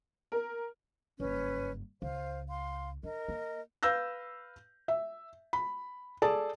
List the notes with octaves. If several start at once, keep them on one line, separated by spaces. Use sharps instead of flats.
A#4
F#1 G2 C#4 B4
C#2 C5 F5
F5 C6
D4 A#4 D#5
A#3
B4 F5 E6 G6 A#6
E5
B5
G#4 A4 D5 A5